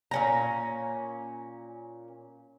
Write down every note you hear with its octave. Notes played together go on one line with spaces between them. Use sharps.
A#2 C#4 A#5